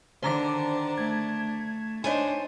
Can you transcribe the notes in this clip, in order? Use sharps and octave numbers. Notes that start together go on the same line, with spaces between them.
D3 D#3 D4 C5 A#5 D6
A3 G#6
D4 D#4 C5 C#5 G#5